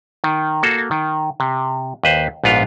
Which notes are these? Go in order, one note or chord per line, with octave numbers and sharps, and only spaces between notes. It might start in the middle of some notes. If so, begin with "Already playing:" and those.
D#3
A#3 F#4 A4
D#3
C3
D#2 B4 C5
A#1 G#2 B3 F4 F5